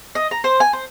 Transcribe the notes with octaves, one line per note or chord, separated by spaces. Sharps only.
D#5
A#5
C5
G#5
C5